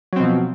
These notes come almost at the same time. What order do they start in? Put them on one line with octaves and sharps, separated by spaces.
F#3 C4 B2 F3